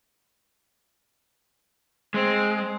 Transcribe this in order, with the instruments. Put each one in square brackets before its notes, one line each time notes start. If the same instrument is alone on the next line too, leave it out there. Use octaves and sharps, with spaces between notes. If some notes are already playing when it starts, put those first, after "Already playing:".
[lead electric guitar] G#3 [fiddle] C4 C5